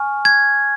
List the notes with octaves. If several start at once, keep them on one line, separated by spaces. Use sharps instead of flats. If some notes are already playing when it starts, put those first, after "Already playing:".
Already playing: G#5 C#6 F6
G#6